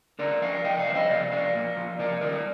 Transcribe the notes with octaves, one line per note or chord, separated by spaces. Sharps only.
D3 A#4 D5
F3 D5 F5
C3 D#5 G5
D5 F5
F3
C5 D#5
C3 D5 F5
F3 D5 F5
A#2
F3
C3 A#4 D5
D#3 G3 A#4 D5